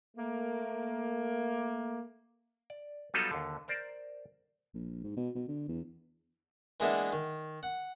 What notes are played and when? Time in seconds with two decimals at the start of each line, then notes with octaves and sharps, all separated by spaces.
0.17 A3 A#3
2.70 D5
3.14 F#3 G3 B3 D#4 F4 A4
3.31 D#2 D3
3.68 A#4 C5 D5
4.74 A#1
5.03 G#2
5.17 B2
5.35 B2
5.48 D3
5.68 E2
6.80 E3 G#3 A#3 B3 D4 E4
7.12 D#3
7.63 F#5